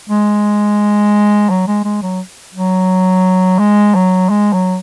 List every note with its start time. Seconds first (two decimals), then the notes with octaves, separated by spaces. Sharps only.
0.09 G#3
1.50 F#3
1.67 G#3
1.85 G#3
2.02 F#3
2.54 F#3
3.59 G#3
3.95 F#3
4.30 G#3
4.53 F#3